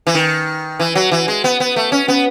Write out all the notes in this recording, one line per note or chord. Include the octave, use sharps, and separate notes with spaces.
E3
D#3
E3
F#3
E3
G#3
B3
B3
A3
C#4
B3